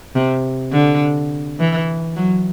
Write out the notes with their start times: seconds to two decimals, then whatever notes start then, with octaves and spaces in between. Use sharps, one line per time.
0.15 C3
0.72 D3
1.60 E3
2.17 F#3